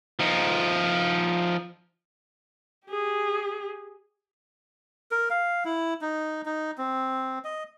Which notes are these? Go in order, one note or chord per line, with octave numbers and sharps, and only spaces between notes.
F3 D#4
G4 G#4
A#4
F5
E4
D#4
D#4
C4
D#5